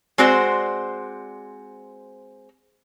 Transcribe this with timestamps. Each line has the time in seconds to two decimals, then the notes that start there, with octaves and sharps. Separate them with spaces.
0.18 G#3 C4 F#4 C5 D5